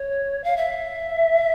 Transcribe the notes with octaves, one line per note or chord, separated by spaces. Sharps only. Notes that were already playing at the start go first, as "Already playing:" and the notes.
Already playing: C#5
F5
E5